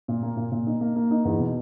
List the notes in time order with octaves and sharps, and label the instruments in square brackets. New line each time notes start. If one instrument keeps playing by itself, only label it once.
[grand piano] A#2
A#3
A#2
A#2
D#4
A#3
A#3
D#4
E2
B2